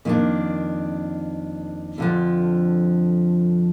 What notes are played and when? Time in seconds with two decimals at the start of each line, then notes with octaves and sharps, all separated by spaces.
0.05 F2 D#3 A#3 D4
1.98 F2 D3 F3